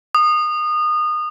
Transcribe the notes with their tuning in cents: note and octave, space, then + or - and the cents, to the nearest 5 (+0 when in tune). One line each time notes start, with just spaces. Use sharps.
D#6 -25